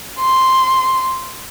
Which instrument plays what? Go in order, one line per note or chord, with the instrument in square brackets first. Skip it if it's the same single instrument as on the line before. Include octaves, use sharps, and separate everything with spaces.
[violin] C6